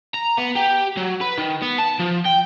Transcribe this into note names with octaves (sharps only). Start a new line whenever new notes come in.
A#5
B3
G4
F#3
B4
D#3
B3
A5
F3
G5